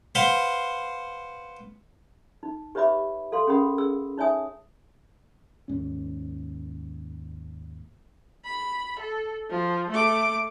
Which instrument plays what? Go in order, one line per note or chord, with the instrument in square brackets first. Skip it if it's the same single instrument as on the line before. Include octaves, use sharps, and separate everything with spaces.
[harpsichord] B4 C5 F5 F#5 C6
[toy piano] D#4
G4 B4 C#5 E5 B5 D6
A4 F5 C6
C#4 G#4 A#4 F#5 B5 D#6
G#4 E6
D#4 C#5 E5 G#5 D#6
[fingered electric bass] D#2 G#2 C#4
[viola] B5
A4
F3
A3 D6